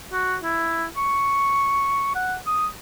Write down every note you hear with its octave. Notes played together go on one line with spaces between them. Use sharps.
F#4
E4
C#6
F#5
D#6